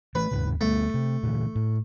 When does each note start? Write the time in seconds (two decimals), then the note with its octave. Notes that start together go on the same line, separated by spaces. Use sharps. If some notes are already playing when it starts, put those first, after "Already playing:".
0.15 E3 A3 B4
0.31 D#2 G#2 C#3
0.61 D2 G3 A3 B3
0.94 C3
1.23 A#2 D3 E3
1.55 A2